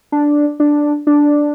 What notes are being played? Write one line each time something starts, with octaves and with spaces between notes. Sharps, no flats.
D4
D4
D4